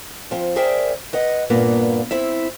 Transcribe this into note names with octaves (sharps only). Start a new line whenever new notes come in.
F3 C4
G#4 A#4 C5 D5 E5 G5
B4 D#5 F#5
G2 A#2 A#3 B3
C4 E4 E5